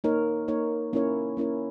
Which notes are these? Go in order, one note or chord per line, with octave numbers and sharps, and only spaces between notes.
A#3 D#4 A#4 C#5
A#3 D#4 A#4 C#5
A#3 C#4 E4 A#4 C#5
A#3 C#4 E4 A#4 C#5